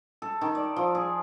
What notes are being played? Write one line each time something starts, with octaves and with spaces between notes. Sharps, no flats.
A4
D#3
D5
F3
G#4